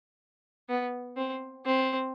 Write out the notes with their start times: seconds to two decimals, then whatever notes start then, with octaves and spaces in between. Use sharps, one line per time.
0.69 B3
1.17 C4
1.65 C4